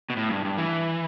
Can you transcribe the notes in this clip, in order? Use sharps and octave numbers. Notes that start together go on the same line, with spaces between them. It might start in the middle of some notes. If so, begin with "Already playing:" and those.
B2
A2
G2
G2
E3